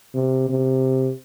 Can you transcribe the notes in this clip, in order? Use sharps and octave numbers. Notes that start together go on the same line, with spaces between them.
C3
C3